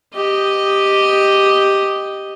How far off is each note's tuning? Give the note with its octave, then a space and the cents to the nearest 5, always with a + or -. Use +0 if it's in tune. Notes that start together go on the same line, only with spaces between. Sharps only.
G4 +0 D#5 +0